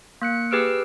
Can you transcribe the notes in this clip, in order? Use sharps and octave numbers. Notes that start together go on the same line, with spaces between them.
A#3 F#6 C#7
G4 G#4 B4 E6 F6 D7